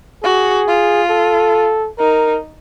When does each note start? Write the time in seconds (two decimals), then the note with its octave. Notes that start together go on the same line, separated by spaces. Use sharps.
0.23 F#4 G#4
0.67 F4
1.10 A4
1.98 D#4 A#4